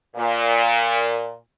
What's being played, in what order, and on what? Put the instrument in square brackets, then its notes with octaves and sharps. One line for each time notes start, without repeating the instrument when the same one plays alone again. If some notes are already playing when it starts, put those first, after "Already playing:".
[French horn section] A#2